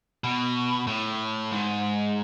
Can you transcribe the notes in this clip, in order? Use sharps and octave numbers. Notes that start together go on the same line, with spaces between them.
B2
A2
G#2